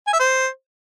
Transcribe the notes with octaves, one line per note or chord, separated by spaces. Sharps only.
G#5
E5
C5